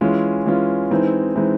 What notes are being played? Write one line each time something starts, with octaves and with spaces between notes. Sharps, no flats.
E3 G#3 C#4 F4
E3 G#3 C#4 F4
E3 G#3 C4 D#4
E3 G#3 C4 D#4